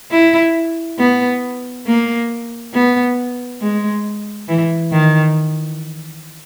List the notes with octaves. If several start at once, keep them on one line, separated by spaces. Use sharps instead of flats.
E4
B3
A#3
B3
G#3
E3
D#3